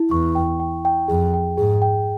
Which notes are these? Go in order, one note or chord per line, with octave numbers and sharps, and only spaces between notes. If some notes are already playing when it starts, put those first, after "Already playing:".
Already playing: E4
E2 C#6
G5
G5
G5
F2 G#4
G5
G#2 G#4
G5